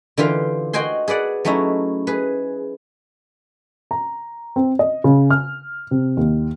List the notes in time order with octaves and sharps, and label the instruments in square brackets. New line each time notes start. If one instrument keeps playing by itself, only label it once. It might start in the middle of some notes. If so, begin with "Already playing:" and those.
[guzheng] D3 E3 F4 G4 F5
F#4 C5 D#5 G5 G#5 C6
G#4 B4 D5 F#5
F#3 A3 C#4 D#4 E4
G#4 B4
[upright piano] A#5
C4
D#5
C#3
F6
C3
D#2